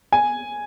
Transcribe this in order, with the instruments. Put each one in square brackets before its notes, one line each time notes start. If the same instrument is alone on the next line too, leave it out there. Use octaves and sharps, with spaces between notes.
[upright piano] G#5